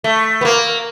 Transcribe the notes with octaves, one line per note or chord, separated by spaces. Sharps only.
A3
B3
A#3